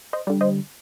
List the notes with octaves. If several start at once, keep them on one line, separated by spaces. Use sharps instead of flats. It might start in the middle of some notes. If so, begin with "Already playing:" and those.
C5 D#5
D3 G3
C5 D#5